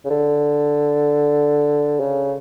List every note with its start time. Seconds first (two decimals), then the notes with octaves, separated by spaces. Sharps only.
0.05 C#3
0.10 D3
2.00 C#3